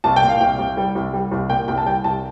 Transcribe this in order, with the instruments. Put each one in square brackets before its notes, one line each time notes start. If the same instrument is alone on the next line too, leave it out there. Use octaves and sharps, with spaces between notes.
[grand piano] C2 A5
G5
A#2
F5
C2 G5
C2
G3
C2
G3
C2
A#2 G5
C2 G5
A5
G3 G5
C2 A5